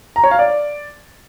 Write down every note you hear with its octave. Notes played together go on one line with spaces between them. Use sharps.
A#5
C#5
F5
D5